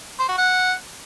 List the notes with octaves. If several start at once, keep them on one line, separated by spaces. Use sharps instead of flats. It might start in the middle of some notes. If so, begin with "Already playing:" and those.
C5
F#4
F#5